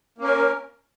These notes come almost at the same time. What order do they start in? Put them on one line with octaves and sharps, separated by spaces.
A#3 C#4 A#4